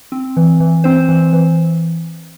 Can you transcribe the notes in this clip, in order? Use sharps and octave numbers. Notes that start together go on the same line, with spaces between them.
C4
E3
E3
C4 C5
E3
E3